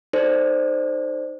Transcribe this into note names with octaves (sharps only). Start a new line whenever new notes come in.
D#4 A4 C5 D5